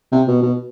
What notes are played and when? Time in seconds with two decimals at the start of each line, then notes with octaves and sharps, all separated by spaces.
0.12 C3
0.28 B2
0.43 B2